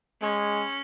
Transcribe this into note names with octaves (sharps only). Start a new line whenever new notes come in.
G#3 C#4